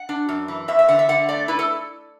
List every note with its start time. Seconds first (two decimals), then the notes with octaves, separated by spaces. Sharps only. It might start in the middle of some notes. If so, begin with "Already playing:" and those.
Already playing: F#5
0.09 D4
0.29 F#2
0.48 E3
0.68 E2 E5
0.79 E5
0.88 D3 F#5
0.99 E5
1.09 D3 F#5
1.29 A3 D5
1.48 E4 B4
1.59 A4